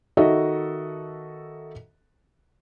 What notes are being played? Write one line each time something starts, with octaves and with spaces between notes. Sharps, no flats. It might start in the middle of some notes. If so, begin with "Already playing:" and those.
D#3 F#4 A4 D#5 E5